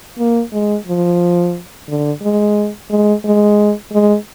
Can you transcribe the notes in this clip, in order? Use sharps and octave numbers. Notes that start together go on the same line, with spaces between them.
A#3
G#3
F3
D3
G#3
G#3
G#3
G#3